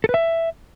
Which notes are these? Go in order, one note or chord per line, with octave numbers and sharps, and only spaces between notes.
A4
B4
E5